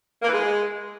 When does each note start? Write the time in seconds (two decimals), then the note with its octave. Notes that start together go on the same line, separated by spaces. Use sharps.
0.22 A#3
0.28 E3
0.34 G#3